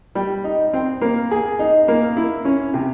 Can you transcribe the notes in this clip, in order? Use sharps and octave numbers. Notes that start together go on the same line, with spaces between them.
G3
D#4
C4
A#3
G#4
D#4
A#3
E4
C#4
C3